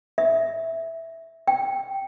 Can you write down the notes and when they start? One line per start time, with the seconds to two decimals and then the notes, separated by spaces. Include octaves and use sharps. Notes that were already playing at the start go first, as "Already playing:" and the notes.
0.18 E5
1.48 G5